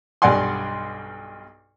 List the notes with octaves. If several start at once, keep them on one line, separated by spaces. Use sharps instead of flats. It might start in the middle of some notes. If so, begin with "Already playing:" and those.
B1 G2 D5 F#5 G#5 C6